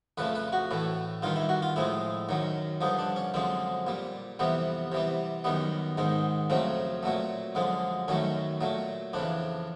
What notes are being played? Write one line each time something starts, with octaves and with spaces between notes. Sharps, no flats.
F2 C#3 F3 A3 B4
B4
F#4
A2 E3 A3
G2 D#3 G3 F4
E4
F#4
F4
A2 F3 G#3 E4
F#2 D#3 F#3
G2 D3 F3 D#4
D4
C#4
F#2 D3 F3 G#3 C4
A#2 G3
F2 C3 E3 G3 B3
C3 E3 G3
F#2 D#3 G3 B3
G#2 D#3 G#3
F2 C#3 F#3 A3 C4
A#2 F#3 A3
F#2 D3 F3 G#3
F#2 D#3 F#3 A3 C#4
A#2 F#3 A3
F2 C#3 E3 D4